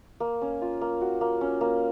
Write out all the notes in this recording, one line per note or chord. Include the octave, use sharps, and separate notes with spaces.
A#3
C#4
F4
A#3
F#4
A#3
C#4
A#3